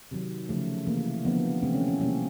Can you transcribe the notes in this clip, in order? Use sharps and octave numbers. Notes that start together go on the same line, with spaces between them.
C3 D#3 F#3
C#3 F3 A3
C3 E3 A3 A#3
D3 F3 A#3 B3
C3 E3 A3 C4
C#4
C#4
B2 G3 A#3 C#4